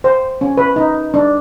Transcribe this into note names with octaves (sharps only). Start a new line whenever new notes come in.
C5
C#4
B4
D#4
D4